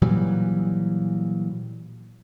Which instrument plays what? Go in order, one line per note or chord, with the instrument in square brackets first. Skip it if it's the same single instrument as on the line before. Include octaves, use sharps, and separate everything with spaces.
[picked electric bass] A#2 E3 F#3 G3